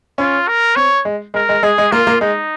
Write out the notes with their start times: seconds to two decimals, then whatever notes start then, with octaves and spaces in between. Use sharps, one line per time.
0.18 C#4 F4
0.48 A#4
0.76 C4 C#5
1.05 G#3
1.34 G#3 A#4
1.49 G#3
1.63 G#3 G#4
1.78 G#3
1.92 A#3 F4
2.07 A#3
2.21 G#3 D#4